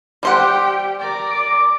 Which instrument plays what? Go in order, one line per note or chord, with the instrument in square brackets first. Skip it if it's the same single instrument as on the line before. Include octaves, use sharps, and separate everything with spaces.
[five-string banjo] G3 C5 F#5 [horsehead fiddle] G4 G5
[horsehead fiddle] A#4 D5
[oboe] D6